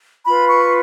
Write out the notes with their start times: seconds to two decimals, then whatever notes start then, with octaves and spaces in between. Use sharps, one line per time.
0.25 F4 B4 B5
0.48 C#6